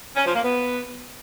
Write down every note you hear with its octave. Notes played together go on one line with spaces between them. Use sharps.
C#4
F3
A#3
B3